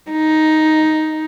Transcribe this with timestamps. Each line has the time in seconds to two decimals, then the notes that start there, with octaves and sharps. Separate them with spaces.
0.11 D#4